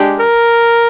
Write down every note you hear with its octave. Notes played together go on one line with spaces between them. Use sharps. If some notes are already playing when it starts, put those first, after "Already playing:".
Already playing: G#3 D4 G4
A#4